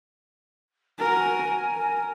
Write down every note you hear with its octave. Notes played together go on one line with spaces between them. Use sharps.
F#4 A#4 G#5
A#4